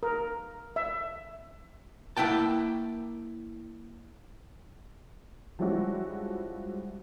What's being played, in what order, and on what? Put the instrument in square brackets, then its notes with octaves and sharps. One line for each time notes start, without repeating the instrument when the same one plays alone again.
[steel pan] A#4
E5
[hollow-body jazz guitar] A#3 E4 F#5 G5 A5
[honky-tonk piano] F3 G3 G#3 C#4 E4 F#4